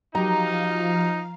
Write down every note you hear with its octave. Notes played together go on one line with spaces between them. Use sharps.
F3 F#3 D#4 G4 F5 A#5